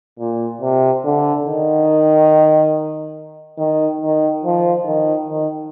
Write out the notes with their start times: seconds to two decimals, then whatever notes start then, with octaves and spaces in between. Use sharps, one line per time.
0.19 A#2
0.61 C3
1.04 D3
1.46 D#3
3.58 D#3
4.01 D#3
4.43 F3
4.86 D#3
5.28 D#3